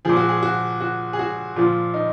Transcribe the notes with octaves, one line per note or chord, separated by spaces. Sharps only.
A#2 F3 G#4
F#4
G#4
F#4
F#4
G#4
F#4
A#2 F3 F4
D#4